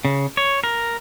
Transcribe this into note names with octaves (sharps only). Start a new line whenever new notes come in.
C#3
C#5
A#4